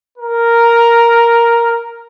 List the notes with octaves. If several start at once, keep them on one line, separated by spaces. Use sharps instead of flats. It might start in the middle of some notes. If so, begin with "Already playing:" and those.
A#4